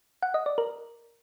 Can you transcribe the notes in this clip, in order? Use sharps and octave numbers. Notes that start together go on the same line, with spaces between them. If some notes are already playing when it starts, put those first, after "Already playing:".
F#5
D#5
D5
A#4